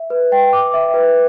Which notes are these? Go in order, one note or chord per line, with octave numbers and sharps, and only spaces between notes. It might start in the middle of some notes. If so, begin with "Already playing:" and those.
Already playing: E5
B4
G5
D6
E5
B4